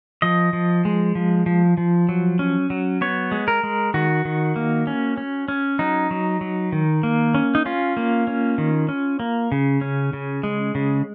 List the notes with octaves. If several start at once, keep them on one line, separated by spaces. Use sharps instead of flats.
F3 D#5
F3
G#3
F3
F3
F3
F#3
C#4
F#3
B3 C#5
G#3
A#4
G#3
D#3 F#4
D#3
A#3
C#4
C#4
C#4
F#3 D#4
F#3
F#3
D#3
A#3
C#4
D#4
C#4 F4
A#3
C#4
D#3
C#4
A#3
C#3
C#4
C#3
G#3
C#3